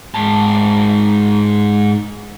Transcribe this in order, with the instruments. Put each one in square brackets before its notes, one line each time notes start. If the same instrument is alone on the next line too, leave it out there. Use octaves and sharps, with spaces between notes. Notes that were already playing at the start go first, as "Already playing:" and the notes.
[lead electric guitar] G#2 A5